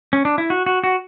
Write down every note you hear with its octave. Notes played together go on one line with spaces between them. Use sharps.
C#4
D4
E4
F#4
F#4
F#4